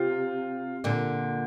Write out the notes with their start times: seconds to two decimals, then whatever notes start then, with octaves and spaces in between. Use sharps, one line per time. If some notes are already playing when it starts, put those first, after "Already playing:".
Already playing: C3 F4
0.84 A#2 D3